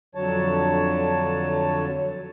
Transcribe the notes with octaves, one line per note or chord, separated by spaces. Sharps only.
F2 D3 F#3 C#5 A5